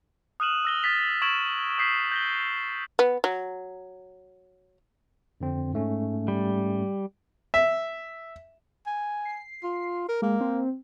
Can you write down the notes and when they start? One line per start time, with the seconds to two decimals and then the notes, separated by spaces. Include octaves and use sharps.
0.40 D#6 F6 F#6 D#7 E7 F#7
0.65 E6 A#6 G7
0.83 F6 A6 B6 F7
1.22 C#6 E6 G#6 D7 E7 F#7
1.78 D#6 G6 B6 C7
2.12 G6 A#6 G7
2.99 B3
3.24 F#3
5.41 F2 D3 C4
5.74 G#2 A3 C#4
6.28 G3
7.54 E5
8.87 G#5
9.25 C7
9.63 F4
10.09 A#4
10.22 G#3 A#3
10.41 C4